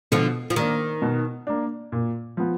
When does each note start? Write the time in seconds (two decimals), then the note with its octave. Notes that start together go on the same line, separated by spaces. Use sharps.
0.12 B2 D3 F3
0.50 F3
0.56 D#3 A#3 D4
1.02 B2
1.47 A#3 D4
1.92 A#2
2.37 F3 B3